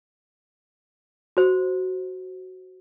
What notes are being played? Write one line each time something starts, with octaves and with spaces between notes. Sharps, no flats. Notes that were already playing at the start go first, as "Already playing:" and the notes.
F#4 C5